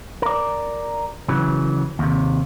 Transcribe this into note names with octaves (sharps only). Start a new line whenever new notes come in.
A#4 D5
C#3 E3 F#3
D#2 C3